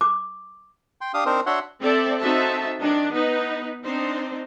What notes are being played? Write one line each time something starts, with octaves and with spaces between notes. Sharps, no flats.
D6
G5 C6
D4 G4 F5 D#6
C4 D4 D#4 A#4 C5
D4 F#4 C#5 E5 F#5 C6
C4 A4 D5 E5
C4 D#4 F#4 A4 E5 A5
D#3 D4
B3 D#4 B4
C4 D4 D#4 C5